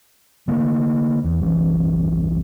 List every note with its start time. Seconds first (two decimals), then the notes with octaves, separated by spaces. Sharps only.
0.48 D3 A3 A#3
1.24 E2
1.40 F#1 B1 E3